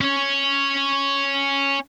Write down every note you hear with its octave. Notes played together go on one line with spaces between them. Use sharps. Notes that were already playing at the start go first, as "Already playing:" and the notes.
C#4 C#5